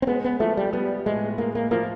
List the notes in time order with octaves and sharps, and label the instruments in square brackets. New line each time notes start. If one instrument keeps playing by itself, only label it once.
[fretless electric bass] C4
[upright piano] G#3 [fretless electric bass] B3
[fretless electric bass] B3
[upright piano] F3 [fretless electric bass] A3
[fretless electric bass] G3
[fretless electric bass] G3 [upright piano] B3
[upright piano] A2 [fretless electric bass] G#3
[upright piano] G#3 [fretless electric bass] A#3
[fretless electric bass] A#3
[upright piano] F3 [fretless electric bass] A#3